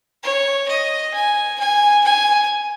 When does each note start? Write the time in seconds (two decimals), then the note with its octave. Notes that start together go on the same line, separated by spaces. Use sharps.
0.23 C#5
0.68 D#5
1.14 G#5
1.60 G#5
2.04 G#5